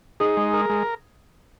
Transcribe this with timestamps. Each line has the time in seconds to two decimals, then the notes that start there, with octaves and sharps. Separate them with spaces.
0.20 D#4 G#4
0.37 G#3
0.54 A#4
0.70 G#3